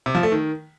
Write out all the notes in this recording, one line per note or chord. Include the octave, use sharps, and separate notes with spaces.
C3
F3
A3
D#3